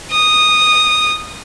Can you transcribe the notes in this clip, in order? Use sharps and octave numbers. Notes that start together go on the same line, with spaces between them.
D#6